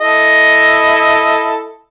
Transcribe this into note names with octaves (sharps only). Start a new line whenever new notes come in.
E4 A4 D#5